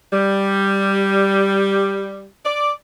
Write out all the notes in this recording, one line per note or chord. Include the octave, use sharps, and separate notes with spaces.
G3
D5